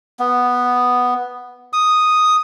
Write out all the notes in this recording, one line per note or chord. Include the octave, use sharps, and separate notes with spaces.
B3
D#6